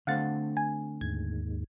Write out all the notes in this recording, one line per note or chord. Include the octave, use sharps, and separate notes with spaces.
D3 A3 C4 F5 F#5 A6
G#5
D#2 G#2 G#6